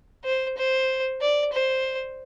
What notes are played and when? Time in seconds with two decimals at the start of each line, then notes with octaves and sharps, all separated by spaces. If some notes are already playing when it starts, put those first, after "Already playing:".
0.25 C5
0.57 C5
1.21 D5
1.53 C5